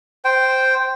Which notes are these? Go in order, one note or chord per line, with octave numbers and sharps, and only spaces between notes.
C5 G5